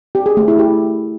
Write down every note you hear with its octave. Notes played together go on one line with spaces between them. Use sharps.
G4
G#4
A3
E4
G4